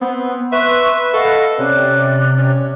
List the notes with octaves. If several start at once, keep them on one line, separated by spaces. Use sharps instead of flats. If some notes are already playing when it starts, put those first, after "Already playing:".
B3 C4
B4 E5 C6 C#6
A4 D#5 F5 F#5
C3 C#4 D5 F#6
C#4